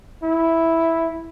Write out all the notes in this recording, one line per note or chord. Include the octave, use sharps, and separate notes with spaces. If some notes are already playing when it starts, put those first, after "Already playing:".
E4